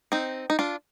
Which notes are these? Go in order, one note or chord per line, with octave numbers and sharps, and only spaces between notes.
C4 D#4
D#4
D4 F4